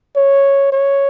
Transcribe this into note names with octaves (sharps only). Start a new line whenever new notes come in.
C#5
C#5